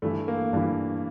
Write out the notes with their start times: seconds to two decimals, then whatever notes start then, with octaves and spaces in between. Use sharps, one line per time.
0.02 G2 E3 A3
0.28 A#3
0.53 G2 E3